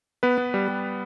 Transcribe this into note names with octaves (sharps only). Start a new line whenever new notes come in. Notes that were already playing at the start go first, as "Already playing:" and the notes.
B3 B4
B3
G3
G3